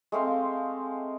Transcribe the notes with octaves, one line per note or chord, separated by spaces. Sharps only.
G#3 A3 C4 F5